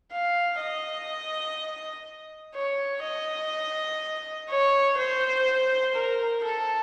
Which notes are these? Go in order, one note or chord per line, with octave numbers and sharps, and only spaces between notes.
F5
D#5
C#5
D#5
C#5
C5
A#4
A4